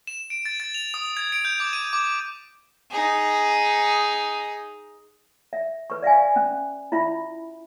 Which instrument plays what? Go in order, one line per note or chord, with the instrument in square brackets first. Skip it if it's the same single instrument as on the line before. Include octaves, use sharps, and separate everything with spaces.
[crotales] E7
D7
A6
A6
F7
D#6
G#6
D7
G6
D6
D#7
D6
[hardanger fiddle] D#4 G#4
[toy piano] E5
B4 C#6
D5 E5 F5 G#5
C#4
E4 F4 E5 B5